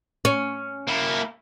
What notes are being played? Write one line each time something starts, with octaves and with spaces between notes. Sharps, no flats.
C#4
A#3 E4